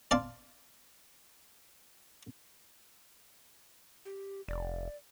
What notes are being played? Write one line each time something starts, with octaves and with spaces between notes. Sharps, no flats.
D5 F5 A5 C6
G4
F1 D5